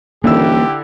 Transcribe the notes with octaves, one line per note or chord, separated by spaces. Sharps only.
D#1 D3 E3 A#3 E4 G4 E6